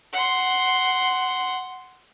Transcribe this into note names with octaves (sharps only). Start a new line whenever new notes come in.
F#5 C6